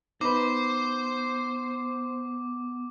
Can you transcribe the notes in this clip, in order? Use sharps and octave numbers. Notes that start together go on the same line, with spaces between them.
B3 D#4 B4 C5 D6